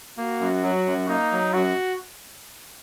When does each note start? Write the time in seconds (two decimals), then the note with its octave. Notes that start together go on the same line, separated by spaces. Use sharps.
0.17 A#3 F#4
0.40 F#2
0.63 F#3
0.86 F#2
1.08 A#3 D#4
1.31 F#3
1.54 F#2 F#4